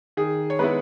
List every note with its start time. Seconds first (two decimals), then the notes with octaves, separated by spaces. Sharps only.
0.17 D#3 G#4
0.50 C#5
0.59 G#3 B3 E4 B4